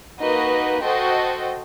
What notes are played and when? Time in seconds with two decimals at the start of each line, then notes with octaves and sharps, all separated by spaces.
0.19 A#3 D#4 F#4 B4 D#5
0.81 F#4 A4 C5 D#5 G5